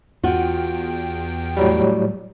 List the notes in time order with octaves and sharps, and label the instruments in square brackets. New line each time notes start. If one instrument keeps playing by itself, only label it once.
[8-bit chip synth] E2 G5 [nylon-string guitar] F4 F#4
[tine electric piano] A2 F#3 G3